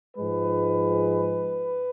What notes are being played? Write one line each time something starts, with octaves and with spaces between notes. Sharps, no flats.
G#2 F3 G#3 B4